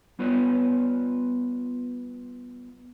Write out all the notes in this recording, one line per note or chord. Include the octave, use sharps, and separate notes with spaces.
G3 B3 F4 B4 C#5